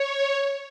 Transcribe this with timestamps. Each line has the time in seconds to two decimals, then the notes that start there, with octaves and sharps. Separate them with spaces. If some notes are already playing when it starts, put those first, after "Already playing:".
Already playing: C#5